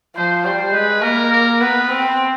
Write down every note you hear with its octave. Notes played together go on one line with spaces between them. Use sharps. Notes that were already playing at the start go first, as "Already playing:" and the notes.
F3 C5
G3 C5
G#3 B4
A#3 A#4
A#4
B3 B4
C4